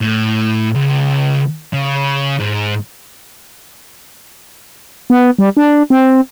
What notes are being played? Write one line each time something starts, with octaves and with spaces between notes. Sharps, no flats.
A2
C#2
C#3
G#2
B3
G3
D4
C4